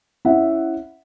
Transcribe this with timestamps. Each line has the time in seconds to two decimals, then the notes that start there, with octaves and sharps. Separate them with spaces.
0.25 C#4 E4 E5 F#5